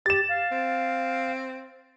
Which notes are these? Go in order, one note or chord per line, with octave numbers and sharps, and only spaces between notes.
G4 A6 E7
F5
C4